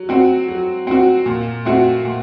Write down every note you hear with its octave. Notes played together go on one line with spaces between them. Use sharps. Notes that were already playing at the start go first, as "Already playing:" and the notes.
Already playing: F#3
C4 F#4
F#3
C4 F#4
A#2
A3 C4 F#4
A#2